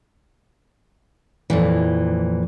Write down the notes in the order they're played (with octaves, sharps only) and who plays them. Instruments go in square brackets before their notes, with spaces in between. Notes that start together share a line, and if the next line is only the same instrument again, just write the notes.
[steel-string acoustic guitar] F2 A#2 E3